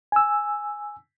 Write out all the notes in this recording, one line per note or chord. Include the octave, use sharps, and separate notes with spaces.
G#5 E6